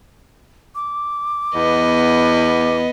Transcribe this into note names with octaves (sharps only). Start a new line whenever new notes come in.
D6
E2 B3 D#5